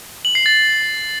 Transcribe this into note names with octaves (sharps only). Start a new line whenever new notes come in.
F#7
C7
A6